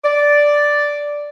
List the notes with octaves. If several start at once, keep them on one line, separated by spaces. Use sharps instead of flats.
D5